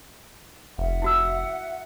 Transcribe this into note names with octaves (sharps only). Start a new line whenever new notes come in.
F1 E5 F#5
E4 F#4 E6